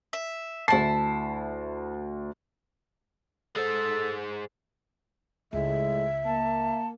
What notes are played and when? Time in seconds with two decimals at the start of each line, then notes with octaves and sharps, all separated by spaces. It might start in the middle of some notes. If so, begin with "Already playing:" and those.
0.13 E5
0.68 D2 E4 A5 C7
3.56 G#3 A4 C5
5.53 C#2 A2 G#3 E5
6.25 A#3 A5